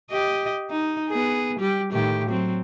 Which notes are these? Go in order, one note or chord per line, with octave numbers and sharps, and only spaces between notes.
G4 D#5
D#4
B3 G#4
G3 G4
A2 D#3 G4
F#3 C4